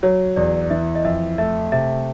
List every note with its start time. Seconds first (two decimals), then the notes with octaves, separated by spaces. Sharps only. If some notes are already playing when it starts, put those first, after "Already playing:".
0.03 F#3 C#5
0.36 E2 D5
0.70 E3 E5
0.95 D#5
1.05 F2 E5
1.38 A3 E5
1.72 C3 E5